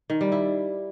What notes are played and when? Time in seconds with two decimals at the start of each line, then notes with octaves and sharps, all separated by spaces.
0.10 D#3
0.21 G3
0.32 E4